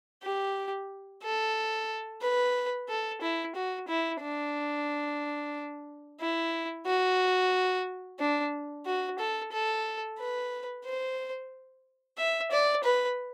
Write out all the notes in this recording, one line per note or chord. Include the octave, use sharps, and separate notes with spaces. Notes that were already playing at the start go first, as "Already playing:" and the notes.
G4
A4
B4
A4
E4
F#4
E4
D4
E4
F#4
D4
F#4
A4
A4
B4
C5
E5
D5
B4